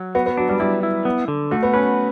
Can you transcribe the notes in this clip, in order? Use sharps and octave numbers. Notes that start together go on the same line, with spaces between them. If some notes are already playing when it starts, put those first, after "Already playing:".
Already playing: F#3
B3 F#4
B3
F#3 D4
G3
G3 E4
E4
B3
D3
A3 F#4
B3
C#4 B4